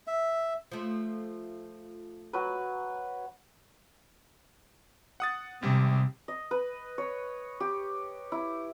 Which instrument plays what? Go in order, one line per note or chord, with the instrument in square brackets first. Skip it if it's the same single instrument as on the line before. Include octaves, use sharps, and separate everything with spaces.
[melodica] E5
[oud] F3 A3
[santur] F#3 B4
[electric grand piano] F#5 D#6 A6
[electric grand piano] G#1 G3 [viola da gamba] C3
[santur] D#5
B4
C#5
G4
E4